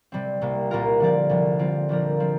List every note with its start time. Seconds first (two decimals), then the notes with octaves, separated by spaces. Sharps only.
0.12 C3 G3 C4
0.41 C2 C3 A#3
0.71 C2 A#2 A#3 F4 A#4
1.00 D3 F3 C4 A#4 D5
1.29 C2 C3 F3
1.59 D3 G3 C4 F4
1.89 A#1 A#2 F3 D4 A#4
2.20 F3 C4